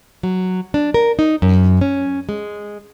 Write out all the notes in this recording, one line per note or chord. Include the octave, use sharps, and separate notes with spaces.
F#3
D4
A#4
D#4
F#2
C#4
G#3